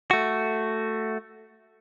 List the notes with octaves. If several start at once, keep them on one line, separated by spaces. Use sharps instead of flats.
A3 F#4